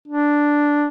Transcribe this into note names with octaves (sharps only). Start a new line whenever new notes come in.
D4